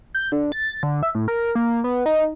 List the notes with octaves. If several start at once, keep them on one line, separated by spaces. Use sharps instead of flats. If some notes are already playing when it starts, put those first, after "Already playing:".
G6
D3
A6
D3
E5
A2
A#4
A#3
B3
D#4